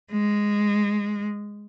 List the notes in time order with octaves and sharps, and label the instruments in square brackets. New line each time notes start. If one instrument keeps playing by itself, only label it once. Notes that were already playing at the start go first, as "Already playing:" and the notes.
[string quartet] G#3